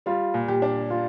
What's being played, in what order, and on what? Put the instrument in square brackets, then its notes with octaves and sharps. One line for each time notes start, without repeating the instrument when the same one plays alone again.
[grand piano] G3 [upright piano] F4
[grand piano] A#2
[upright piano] G4
[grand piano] D4
[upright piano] F4